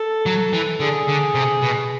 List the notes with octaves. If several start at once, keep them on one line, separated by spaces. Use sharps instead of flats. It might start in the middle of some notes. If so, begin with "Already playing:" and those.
Already playing: A4
F#3
E3
D3 G#4
D3
C3
B2